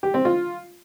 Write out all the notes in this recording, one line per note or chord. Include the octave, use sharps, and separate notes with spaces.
G4
C4
F4